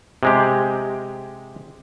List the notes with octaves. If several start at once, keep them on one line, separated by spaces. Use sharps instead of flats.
C3 G#3 G4